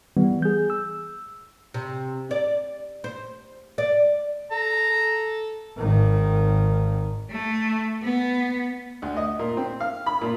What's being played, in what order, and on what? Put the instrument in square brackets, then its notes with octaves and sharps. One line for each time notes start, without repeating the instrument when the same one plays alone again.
[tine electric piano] E3 G3 B3
G#4 G6
E6
[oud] C3
D5
C5
D5
[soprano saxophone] A4 [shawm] A#5
[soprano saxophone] A4
[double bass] G#1 D#3
[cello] A3
B3
[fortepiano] D2
D#5
A#2
C4
F5
B5
A#2